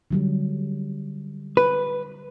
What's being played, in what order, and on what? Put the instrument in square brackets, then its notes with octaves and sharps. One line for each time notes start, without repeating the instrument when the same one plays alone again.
[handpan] D3 F#3 G3
[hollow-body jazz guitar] B4